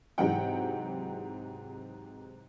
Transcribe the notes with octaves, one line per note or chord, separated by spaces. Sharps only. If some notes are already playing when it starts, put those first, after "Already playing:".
G#2 C3 E3 F#3 F#5 G5